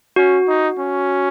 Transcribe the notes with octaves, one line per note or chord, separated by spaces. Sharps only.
C#4 F#4
D#4
C#4